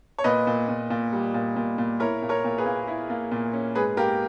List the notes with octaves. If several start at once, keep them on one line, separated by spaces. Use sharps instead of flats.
C#5
A#2 B4 D#5
A#2
A#2
A#2
G3
A#2
A#2
A#2
E4 A#4 C#5
A#2
A#4 C#5
A#2
G#4 B4
A#3
E4
A#3
A#2
C#4
G#2 G#4 B4
A#3 G4 A#4